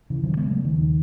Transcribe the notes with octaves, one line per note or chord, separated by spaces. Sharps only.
C#3 E3
D#3 F#3
C#3
G#3 B3
C#3 F#3 A3
D#3 F#3
D#2
D#3